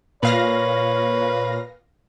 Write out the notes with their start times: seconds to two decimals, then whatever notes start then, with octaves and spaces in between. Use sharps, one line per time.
0.23 A#2 B4 C#5 F5 A#6